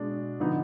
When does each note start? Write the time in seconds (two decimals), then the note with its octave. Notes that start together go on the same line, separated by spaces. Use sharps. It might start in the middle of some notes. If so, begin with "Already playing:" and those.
Already playing: B2 G#3 D4
0.40 D3 F3 B3 D#4